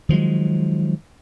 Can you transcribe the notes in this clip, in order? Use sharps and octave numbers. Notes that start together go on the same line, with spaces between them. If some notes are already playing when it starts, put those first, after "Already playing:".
D#3 F3 F#3 G#3